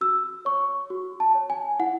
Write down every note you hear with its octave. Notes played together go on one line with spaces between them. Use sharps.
F#4 E6
C#5 C#6
F#4
A5
C#5
G#5
E4 F#5